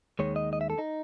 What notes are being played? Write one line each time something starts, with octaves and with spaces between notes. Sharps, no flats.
D#2 D#3 G#3 C#5
D#5
D#5
E5
A4
D#4